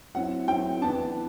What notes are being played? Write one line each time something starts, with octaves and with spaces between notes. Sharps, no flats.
F#3 C4 E4 F#5
F#3 C4 E4 G5
E3 B3 D4 A5